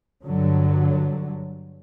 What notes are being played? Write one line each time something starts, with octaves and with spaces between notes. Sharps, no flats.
G2 D3 F#3